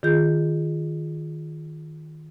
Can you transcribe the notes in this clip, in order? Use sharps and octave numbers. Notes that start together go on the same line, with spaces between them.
D#3 F4 G#4 G6